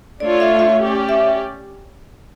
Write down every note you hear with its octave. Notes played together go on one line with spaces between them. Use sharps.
A3 D4 F4 C#5 D5
E5
E5
C#4 G4 D5
E5